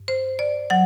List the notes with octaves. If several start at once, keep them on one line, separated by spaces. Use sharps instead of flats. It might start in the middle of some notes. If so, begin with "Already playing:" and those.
Already playing: G2
C5
D5
F#3 F#5